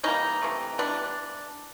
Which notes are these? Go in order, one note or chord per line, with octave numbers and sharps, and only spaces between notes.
E3 G3 A#3 C#4 D#4
C3 E3 A3
E3 G3 B3 C4 D4